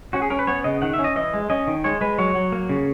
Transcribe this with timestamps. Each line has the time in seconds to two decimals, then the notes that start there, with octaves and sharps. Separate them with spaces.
0.13 C#4 F#4
0.22 G#4
0.30 C#4 A#4
0.39 B4
0.47 B3 C#5
0.64 C#3 D#5
0.82 D#3 F#5
0.93 E5
0.99 C#4
1.04 D#5
1.16 E3 D#5
1.33 G#3
1.50 C#4 D#5
1.67 D#3
1.84 G#3 C#5
2.01 G#3 B4
2.18 F#3 C#5
2.35 F#3
2.52 A#3
2.69 C#3